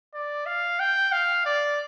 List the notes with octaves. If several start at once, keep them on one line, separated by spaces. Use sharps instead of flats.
D5
F5
G5
F5
D5